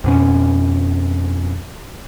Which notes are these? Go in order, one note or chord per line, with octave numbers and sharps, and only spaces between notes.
F2 B2 C#4